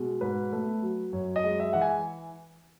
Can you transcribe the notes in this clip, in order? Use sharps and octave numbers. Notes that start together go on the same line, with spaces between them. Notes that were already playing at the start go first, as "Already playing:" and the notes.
Already playing: B2 G#3
G#2 B4
A3
F#3
F#2 C#5
D#5
G#3
E5
E3 F#5
G#5